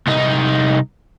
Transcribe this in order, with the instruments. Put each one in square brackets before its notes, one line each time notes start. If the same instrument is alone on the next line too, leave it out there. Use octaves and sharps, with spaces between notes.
[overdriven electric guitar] C2 D#4